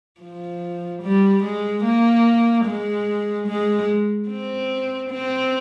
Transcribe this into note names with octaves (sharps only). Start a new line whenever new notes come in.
F3
G3
G#3
A#3
G#3
G#3
C4
C4